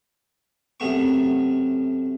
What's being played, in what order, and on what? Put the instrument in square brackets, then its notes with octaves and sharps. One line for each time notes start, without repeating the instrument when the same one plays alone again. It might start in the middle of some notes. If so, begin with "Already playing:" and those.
[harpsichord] F#2 C3 A3 B3 C#6